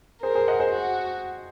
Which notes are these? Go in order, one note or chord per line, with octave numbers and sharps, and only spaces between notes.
G#4 A#4 C5
G#4 C5
D#5 F#5
G#4 C5
F#4